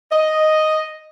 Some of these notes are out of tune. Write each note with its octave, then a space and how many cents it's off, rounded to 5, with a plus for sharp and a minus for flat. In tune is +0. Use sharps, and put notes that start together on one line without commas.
D#5 +0